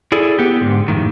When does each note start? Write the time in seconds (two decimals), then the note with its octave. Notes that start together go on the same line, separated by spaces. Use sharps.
0.12 E4 G#4 A4 D5
0.39 B3 G4
0.61 G#2 D3
0.88 F2 A2 D#3